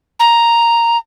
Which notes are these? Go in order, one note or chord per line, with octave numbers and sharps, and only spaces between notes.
A#5